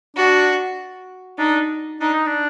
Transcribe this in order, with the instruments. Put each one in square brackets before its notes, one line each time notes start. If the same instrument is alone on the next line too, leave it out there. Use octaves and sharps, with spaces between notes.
[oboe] D4 [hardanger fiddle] F#4
[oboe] D4 [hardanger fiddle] D#4
[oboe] D4 [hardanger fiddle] D#4
[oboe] D#4
D4